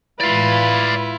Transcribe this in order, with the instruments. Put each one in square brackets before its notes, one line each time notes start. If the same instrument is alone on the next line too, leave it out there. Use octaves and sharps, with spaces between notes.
[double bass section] A2 E3 G#3 [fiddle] E4 F4 [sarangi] B4 [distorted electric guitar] D5 F5